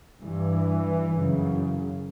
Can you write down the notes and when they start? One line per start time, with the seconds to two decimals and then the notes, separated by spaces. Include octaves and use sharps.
0.22 G2 E3
1.11 F#2 C#3